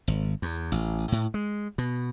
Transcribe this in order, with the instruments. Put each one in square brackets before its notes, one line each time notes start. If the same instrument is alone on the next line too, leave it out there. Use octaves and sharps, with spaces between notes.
[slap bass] G#1
E2
A1
A2
G#3
B2